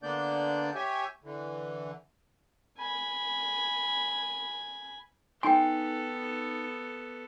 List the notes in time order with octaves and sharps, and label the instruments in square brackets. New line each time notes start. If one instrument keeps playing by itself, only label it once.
[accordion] D3 A#3 B3 D4 D5 G6
G4 C#5 E5 G#5
D3 E3
[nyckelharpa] G#5 B5
[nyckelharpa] B3 A4 [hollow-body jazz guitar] D#4 C6 [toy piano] G5 G#5